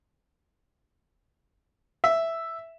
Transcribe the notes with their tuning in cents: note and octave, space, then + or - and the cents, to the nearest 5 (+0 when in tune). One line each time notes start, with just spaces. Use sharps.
E5 +0